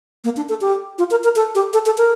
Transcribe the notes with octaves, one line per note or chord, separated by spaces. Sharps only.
A#3
D4
A4
G4
F4
A#4
A#4
A4
G4
A4
A4
A#4